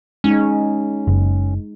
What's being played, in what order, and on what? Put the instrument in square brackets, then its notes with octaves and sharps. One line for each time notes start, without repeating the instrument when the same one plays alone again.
[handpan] G#3 D#4 [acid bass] C#4
[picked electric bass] F#1